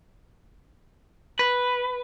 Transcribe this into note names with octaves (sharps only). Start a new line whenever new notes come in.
B4